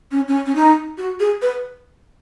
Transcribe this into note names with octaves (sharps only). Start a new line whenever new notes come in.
C#4
C#4
C#4
D#4
F#4
G#4
B4